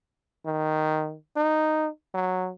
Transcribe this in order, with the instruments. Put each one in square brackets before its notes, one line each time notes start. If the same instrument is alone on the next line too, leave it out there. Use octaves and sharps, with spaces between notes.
[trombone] D#3
D#4
F#3